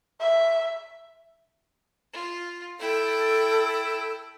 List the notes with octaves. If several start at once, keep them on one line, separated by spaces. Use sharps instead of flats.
E5
F4
E4 A4 G5